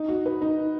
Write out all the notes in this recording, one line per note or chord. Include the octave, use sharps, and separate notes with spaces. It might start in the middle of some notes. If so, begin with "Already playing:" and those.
Already playing: D#4
F#4
B4
D#4